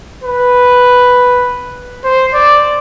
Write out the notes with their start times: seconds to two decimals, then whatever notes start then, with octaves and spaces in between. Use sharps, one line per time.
0.24 B4
2.04 C5
2.34 D5